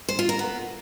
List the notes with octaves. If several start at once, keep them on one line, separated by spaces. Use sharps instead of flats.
C5
F4
A#4
B3